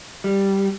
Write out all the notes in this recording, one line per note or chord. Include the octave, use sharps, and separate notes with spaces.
G3